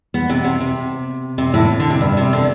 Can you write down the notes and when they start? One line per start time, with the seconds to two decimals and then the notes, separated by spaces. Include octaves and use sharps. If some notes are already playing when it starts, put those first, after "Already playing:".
0.14 B3
0.29 C3
0.45 C3
0.60 C3
1.38 C3
1.54 A2
1.80 D3
1.90 C3
2.01 G2
2.17 C3
2.33 D3